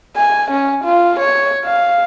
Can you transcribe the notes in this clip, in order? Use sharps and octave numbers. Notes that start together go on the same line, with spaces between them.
G#5
C#4
F4
C#5
F5